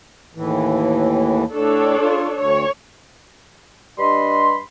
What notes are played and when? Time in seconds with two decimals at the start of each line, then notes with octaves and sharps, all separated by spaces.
0.35 D#2 A2 E3
1.53 A2 D4 A4 C#5
2.02 F4
2.37 D2 C#5
3.98 G2 G3 D4 D#5 B5 C6